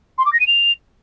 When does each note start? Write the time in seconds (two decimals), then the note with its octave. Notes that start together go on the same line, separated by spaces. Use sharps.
0.18 C6
0.26 D6
0.33 A#6
0.40 D#7
0.47 F7